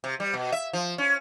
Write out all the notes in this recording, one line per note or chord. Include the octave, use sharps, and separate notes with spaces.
C3
G3
B2
E5
F3
C#4